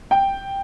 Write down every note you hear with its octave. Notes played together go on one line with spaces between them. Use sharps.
G5